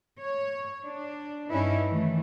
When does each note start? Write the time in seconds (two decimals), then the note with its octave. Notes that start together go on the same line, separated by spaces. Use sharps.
0.22 C#5
0.86 D4
1.51 G2 C#4 D#4 E4 B4
1.88 D#3 E3 A3